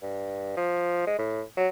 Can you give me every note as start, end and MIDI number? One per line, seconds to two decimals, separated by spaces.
0.02 0.53 43
0.56 1.02 53
1.07 1.18 56
1.19 1.42 45
1.57 1.68 54